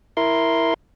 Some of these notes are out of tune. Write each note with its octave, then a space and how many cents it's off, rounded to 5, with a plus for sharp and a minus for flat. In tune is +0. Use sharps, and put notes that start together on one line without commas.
E4 +0 A#4 +0 C6 +0